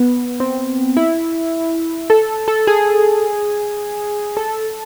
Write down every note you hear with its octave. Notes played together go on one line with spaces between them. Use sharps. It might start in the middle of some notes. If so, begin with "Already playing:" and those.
Already playing: B3
C4
E4
A4
A4
G#4
A4